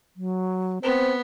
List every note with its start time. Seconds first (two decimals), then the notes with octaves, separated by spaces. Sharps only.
0.16 F#3
0.83 B3 C4 C5